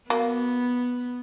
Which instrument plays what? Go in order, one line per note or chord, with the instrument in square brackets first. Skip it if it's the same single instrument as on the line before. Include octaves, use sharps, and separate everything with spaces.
[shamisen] F#3 A#3 [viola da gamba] B3